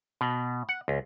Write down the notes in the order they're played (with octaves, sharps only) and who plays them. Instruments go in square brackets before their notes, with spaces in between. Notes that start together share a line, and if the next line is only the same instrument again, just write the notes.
[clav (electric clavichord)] B2
F#5
C#2